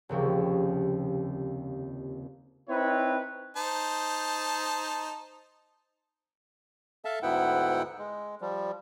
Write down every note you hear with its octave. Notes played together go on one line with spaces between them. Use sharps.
F1 D#2 C#3 F3
C4 D#4 E4 B4 C#5
D#4 C5 A5
A4 E5 F5 A5
D2 G#2 B3 E4 F#5 G5
G#3
F3 G3